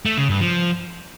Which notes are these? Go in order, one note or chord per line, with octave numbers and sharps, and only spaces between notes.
A3
C#3
G2
F3